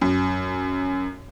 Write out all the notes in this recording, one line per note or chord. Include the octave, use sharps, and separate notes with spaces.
F#2